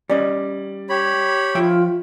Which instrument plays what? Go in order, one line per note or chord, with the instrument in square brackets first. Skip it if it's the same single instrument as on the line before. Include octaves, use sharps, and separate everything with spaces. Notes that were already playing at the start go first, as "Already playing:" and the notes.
[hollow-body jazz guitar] G3 C#4 D#5 [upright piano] D5
[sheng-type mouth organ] G4 C#5 B5
[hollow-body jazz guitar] F3 E5 G5 [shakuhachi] F4